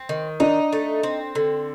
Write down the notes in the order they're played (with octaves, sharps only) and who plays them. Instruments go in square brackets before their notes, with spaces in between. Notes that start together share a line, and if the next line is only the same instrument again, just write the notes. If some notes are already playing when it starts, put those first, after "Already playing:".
Already playing: [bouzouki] C4
D#3
[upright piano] D4 [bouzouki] D#4
[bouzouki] A3
C4
D3